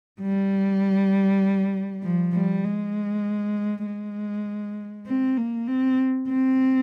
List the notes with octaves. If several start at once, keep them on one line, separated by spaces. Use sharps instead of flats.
G3
F3
G3
G#3
G#3
C4
A#3
C4
C4